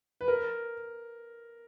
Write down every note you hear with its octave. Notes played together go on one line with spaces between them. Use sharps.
B4
A#4